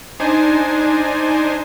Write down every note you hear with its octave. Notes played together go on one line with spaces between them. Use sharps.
D4 D#4 C5 G#5